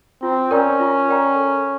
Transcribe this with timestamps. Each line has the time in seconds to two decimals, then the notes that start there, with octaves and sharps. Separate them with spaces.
0.22 C4 F4
0.51 C#4 A#4 D5 G5 A#5
0.80 F4
1.08 A#4 D5 G5 A#5
1.36 A4